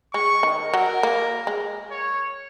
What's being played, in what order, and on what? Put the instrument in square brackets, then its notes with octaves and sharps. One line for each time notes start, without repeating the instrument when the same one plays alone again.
[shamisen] G#3 [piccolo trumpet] C#6
[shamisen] D#3
[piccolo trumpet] A#4
[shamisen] F#3
A#3
G#3
[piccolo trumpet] C#5